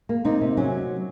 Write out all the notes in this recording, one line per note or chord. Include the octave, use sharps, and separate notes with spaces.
A#3
C3 D#4
C3
F#3 C#4